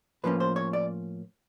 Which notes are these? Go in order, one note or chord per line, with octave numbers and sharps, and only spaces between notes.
A2 F3 A#3 C#4 B4
C5
C#5
D5